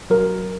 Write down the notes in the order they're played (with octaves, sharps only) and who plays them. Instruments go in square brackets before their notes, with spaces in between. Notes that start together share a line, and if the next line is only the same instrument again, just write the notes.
[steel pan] F#3 A#4